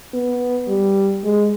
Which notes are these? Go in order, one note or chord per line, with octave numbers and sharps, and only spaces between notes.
B3
G3
G#3